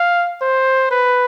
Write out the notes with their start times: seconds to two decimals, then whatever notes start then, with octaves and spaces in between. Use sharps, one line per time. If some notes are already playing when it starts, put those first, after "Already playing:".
Already playing: F5
0.41 C5
0.91 B4